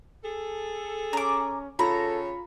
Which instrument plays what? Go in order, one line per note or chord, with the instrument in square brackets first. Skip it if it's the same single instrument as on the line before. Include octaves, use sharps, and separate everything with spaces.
[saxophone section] G#4 A4
[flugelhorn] C#4 [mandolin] A#5 D6
[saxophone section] C#3 C#5 [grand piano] F4 B5 [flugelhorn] A4 [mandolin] A#5